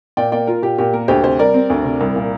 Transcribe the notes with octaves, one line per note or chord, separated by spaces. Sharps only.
A#2 D5 G5
A#3 D5 G5
F4 A#4
A#2 G4
A#2 G4
A#3 A#4
D2 G4 C5
C3 G4 C5
G3 A#4 D5
C4
D2
C3
C2
A#2